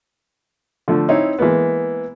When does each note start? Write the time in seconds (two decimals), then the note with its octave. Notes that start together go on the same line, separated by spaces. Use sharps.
0.88 D3 F3 A3
1.09 C4 D#4 E4 C5 C#5
1.38 E3 G#3 A#3 B3